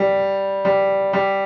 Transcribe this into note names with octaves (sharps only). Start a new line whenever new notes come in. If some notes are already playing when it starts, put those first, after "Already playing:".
Already playing: G3
G3
G3